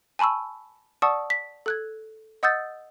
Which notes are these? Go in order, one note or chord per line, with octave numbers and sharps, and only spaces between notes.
G#5 A5 B5 C#6 E6
D5 F#5 A5 C#6 D#6 E6
B6
A4 F#6 G#6
D#5 F#5 D#6 E6 G6 A6